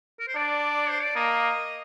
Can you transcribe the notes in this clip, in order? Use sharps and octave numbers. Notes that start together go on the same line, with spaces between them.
A#4
C5
D4 D5
C5
D5
A#3 D#5